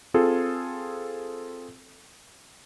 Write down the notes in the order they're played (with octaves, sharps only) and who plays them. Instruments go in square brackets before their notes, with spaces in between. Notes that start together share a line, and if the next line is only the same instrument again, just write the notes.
[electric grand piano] C4 F4 G#4 A4